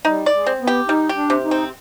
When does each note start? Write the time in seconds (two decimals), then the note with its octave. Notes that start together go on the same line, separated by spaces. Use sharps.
0.05 G3 D#4
0.26 D5
0.33 G#3
0.46 C4
0.61 B3
0.67 G4
0.88 G3 D#4
1.09 G4
1.16 D4
1.30 C3
1.44 D#4
1.51 C4